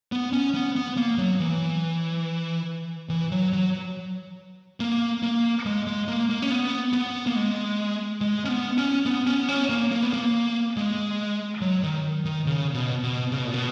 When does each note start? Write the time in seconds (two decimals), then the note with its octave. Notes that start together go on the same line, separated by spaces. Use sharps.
0.12 B3
0.33 C#4
0.54 B3
0.76 B3
0.97 A#3
1.18 F#3
1.40 E3
3.09 E3
3.32 F#3
3.53 F#3
4.80 A#3
5.23 A#3
5.66 G#3
5.87 G#3
6.08 A#3
6.30 A#3
6.42 C#4
6.51 B3
6.93 B3
7.27 A#3
7.36 G#3
8.21 G#3
8.45 C#4
8.49 B3
8.78 C#4
9.06 B3
9.27 C#4
9.41 B3
9.49 C#4
9.69 A#3
9.91 A#3
10.02 B3
10.13 A#3
10.77 G#3
11.61 F#3
11.83 D#3
12.25 D#3
12.46 C#3
12.74 B2
13.03 B2
13.32 C#3
13.38 B2
13.46 A#2
13.54 B2